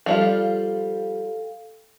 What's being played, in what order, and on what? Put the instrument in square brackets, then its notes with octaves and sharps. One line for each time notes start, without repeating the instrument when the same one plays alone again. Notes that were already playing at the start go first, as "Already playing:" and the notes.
[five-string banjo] F3 G3 F4 [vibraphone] A4 F5 G5